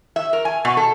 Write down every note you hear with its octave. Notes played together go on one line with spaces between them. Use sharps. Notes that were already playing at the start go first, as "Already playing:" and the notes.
E5
A#4
G#5
B2
A4